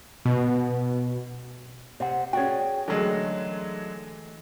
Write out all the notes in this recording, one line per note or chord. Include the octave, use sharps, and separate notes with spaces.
B2
C3 C5 F#5
C#4 F#4 G#4 D5 G5
D3 E3 F#3 G#3 A3 A#4